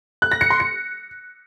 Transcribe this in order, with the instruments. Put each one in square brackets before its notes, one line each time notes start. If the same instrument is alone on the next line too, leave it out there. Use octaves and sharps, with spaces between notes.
[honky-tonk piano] F#6
A#6
C#7
C6
C#7